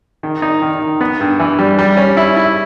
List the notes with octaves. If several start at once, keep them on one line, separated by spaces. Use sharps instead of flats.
D#3
D#4
D#3
D#3
B3
G2
E3
G3
G3
C#4
E4
E4